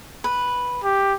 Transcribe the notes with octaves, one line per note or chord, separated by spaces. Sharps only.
B4
G4